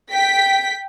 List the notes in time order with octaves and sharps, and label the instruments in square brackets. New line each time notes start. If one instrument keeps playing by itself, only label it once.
[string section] G5 B6